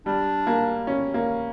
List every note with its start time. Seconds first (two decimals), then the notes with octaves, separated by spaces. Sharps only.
0.06 G3 D4
0.47 A#3
0.87 C#4
1.14 A#3